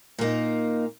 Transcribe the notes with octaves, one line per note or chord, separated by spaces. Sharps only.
A#2 A#3 D#4